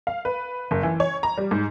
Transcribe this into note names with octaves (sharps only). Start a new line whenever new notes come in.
F5
B4
F#1
E3
C#5
A#5
G3
G#2